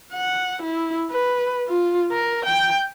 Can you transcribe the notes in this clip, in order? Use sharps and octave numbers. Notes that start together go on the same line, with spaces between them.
F#5
E4
B4
F4
A#4
G5